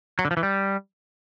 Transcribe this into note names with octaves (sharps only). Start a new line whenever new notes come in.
F#3
D3
F3
E3
G3